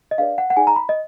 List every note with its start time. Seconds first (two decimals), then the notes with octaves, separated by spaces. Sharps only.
0.11 D#5
0.18 D4 G#4 B4 D5 F5
0.38 F#5
0.50 F#5
0.57 D#4 G#4 D5 G#5
0.67 A#5
0.76 B5
0.89 D#5